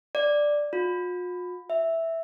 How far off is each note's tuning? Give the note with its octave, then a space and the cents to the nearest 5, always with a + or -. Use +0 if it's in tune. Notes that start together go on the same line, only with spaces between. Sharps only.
D5 +0
F4 +45
E5 -5